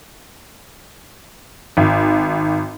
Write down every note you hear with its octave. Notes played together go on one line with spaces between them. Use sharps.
G#1